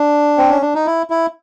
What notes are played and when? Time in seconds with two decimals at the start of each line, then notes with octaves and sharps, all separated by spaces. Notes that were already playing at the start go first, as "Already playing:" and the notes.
Already playing: D4
0.38 C4
0.50 C#4
0.62 D4
0.74 D#4
0.86 E4
1.10 E4